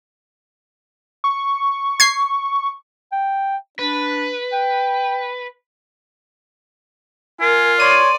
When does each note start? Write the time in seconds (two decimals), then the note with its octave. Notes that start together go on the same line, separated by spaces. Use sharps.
1.24 C#6
2.00 G#6 C7
3.12 G5
3.79 D4 B4
4.53 G5
7.41 F4 A#4 G#5
7.80 C#5 D5 C6 D#7